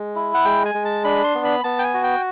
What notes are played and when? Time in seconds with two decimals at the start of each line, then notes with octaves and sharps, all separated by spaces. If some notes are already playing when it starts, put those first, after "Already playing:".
Already playing: G#3
0.15 E4
0.34 F#5
0.45 G#3 G5
0.65 G#5
0.75 G#3
0.85 A5
1.05 D4 B5
1.24 C6
1.35 B3
1.44 B5
1.64 B3 A5
1.79 G5
1.84 G#5
1.94 F#4
2.04 G5